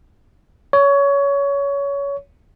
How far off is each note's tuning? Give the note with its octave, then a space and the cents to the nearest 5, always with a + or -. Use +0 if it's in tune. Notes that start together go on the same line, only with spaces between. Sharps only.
C#5 +20